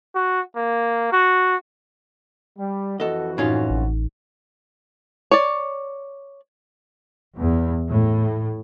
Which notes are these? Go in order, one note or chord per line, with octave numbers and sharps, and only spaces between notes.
F#4
A#3
F#4
G3
F2 E3 F#4 A4 D#5
F#2 A2 C#4 D#4 F4 G#6
A1
C#5 D5
E2
A2